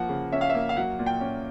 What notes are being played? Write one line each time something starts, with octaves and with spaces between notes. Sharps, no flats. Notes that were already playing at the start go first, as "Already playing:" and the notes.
Already playing: F3 A#3 F#5
C#3
C#4 E5
F5
E5
A#3
F5
F#3 F#5
A#2
G5
C#4